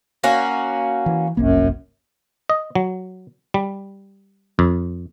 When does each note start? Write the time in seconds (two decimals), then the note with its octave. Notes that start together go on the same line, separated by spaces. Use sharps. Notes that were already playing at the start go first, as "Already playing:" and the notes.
0.24 A#3 C#4 F#4
1.06 E3
1.37 G1 C2 F#2 A#3
2.50 D#5
2.75 F#3
3.54 G3
4.59 F2